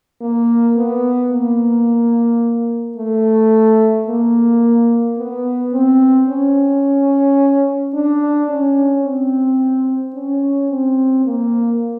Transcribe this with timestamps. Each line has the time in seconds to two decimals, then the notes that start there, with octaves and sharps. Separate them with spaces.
0.21 A#3
0.76 B3
1.31 A#3
2.97 A3
4.08 A#3
5.18 B3
5.73 C4
6.29 C#4
7.94 D4
8.49 C#4
9.05 C4
10.15 C#4
10.71 C4
11.25 A#3